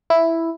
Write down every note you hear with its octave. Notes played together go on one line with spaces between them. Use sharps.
E4